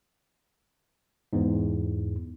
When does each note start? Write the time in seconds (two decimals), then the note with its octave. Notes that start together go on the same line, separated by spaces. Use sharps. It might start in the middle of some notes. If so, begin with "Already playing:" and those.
1.33 E2 G#2